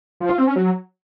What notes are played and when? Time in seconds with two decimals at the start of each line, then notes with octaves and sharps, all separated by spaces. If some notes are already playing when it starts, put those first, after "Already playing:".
0.20 F3
0.29 F4
0.38 C4
0.47 C#4
0.56 F#3